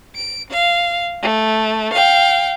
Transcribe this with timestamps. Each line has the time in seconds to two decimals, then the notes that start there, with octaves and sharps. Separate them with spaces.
0.16 D7
0.50 F5
1.22 A3
1.93 F5 G5